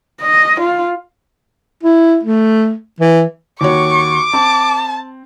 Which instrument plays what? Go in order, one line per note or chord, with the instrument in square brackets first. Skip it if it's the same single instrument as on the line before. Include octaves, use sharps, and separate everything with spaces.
[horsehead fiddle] D#5
F4
[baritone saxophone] E4
A3
E3
[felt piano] D#2 F#4 C#5 [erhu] C#6 [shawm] D6
[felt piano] C4 [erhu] A5